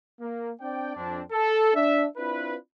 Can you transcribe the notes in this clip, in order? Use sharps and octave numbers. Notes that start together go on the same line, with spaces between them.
A#3
C4 D4 D5 G5
F2 C4 D4
A4
D4 E5
C4 D4 E4 F4 B4